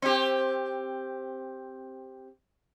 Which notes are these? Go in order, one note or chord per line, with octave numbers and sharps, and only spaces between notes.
C4 G4